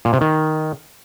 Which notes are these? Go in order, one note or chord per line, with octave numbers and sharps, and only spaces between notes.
A#2
C3
D#3